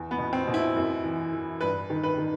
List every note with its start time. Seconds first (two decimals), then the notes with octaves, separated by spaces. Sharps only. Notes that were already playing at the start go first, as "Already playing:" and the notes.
Already playing: E2
0.11 B3
0.18 B2
0.33 C4
0.47 B2
0.54 E4
0.76 F#2
1.04 E3
1.33 E3
1.61 G2 B4
1.90 D#3
2.03 B4
2.18 D#3